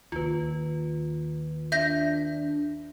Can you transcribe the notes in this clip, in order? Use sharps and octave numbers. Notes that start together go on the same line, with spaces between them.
D#2 F4 B4
D4 E5 G6 A#6